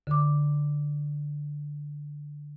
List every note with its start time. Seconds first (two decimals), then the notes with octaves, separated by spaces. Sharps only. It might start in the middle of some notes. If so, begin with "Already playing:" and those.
0.07 D3 D6